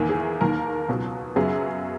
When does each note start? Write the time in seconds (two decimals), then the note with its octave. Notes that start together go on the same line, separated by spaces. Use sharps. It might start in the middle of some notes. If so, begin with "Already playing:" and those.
Already playing: E2 D#3 A#3 E4
0.09 G#4
0.41 D#2 D#3 A#3 A#4
0.88 C#2 B2 F#3
1.36 F#2 C#3 F#3 B3 G#4